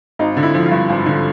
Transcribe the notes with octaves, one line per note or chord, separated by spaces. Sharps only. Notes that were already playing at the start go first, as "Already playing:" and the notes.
G#1 D#4
D3
E4
F3
F4
G2
G#1
D3